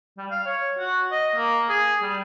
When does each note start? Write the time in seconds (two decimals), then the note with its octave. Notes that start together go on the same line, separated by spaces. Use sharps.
0.18 G3
0.31 F5
0.46 C#5
0.78 F#4
1.12 D#5
1.36 A#3
1.69 G#4
2.02 G3